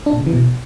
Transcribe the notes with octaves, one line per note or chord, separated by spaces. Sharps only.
D4
A#2
C#3
E3
B2